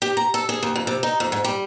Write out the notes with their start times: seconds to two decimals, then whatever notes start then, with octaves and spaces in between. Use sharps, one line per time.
0.02 G4
0.17 A#5
0.34 A4
0.49 G#4
0.63 D#2
0.76 F2
0.87 C3
1.03 D#4
1.20 F2
1.32 G#2
1.44 G3